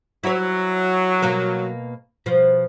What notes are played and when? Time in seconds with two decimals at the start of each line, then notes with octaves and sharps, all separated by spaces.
0.24 F#3 E4 C#5
1.22 B2 A#3 A#4
2.26 B2 F3